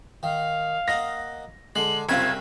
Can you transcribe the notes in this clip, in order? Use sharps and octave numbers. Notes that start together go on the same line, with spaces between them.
D#3 F5
A#3 D#5 F#5 A#6
D3 G#3 D5 F#7
F#1 C2 C4 F4 E5 B5 G#6